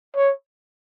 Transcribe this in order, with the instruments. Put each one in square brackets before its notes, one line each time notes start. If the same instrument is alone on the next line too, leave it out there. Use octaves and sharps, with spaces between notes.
[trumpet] C#5